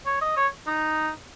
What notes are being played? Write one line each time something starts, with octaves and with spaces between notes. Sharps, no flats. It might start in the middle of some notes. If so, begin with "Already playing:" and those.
C#5
D#5
C#5
D#4